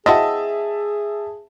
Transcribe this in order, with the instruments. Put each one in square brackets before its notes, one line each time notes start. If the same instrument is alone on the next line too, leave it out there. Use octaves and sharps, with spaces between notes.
[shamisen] C4 E4 F#4 [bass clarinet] G#4 [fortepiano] D#5 [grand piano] E5 A5